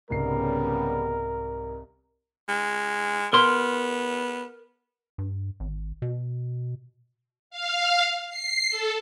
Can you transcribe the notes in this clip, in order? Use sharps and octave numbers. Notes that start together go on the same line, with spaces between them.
C2 G#2 C#3 G3 B3 A#4 C7
G#3
B3 A#4 C6
G2
G#1
B2
F5
C7
A4